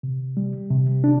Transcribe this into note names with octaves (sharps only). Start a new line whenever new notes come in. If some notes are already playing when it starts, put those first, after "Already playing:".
C3
G3
C3
D4